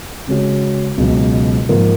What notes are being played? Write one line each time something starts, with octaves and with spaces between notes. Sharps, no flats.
C#3 G#3 C#4 F#4
C#2 B2 F#3
G#2 F3 A#3